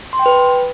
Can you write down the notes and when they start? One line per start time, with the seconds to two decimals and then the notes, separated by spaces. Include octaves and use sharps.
0.13 C6
0.19 G5
0.26 B4